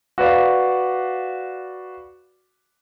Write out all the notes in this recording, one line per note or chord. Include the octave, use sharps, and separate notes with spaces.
F#4 B4 D5 F5